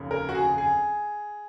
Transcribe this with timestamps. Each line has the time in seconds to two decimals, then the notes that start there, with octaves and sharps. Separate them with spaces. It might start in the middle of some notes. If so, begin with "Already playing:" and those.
Already playing: F1 D#2 C#3
0.11 A#4
0.29 F#4
0.35 G#4
0.58 G#4